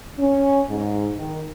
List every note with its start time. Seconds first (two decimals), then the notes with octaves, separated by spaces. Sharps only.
0.19 C#4
0.69 G#2
1.18 D#3